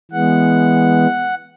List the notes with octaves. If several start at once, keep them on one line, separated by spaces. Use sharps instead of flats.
E3 G#3 B3 F#5